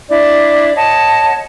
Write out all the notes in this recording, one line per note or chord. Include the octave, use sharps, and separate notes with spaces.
D4 E4 D5
C#5 D#5 F#5 A5